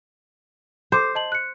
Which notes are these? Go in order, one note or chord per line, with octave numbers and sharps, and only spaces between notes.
A4 C5 D6
D#5 A5 F#7
F#6 C#7